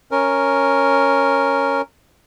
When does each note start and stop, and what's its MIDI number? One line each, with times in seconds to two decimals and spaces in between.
0.11 1.81 61
0.11 1.81 70